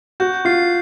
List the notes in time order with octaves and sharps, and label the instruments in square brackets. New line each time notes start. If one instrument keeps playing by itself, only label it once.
[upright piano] F#4 [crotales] G6
[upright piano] F4 [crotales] C7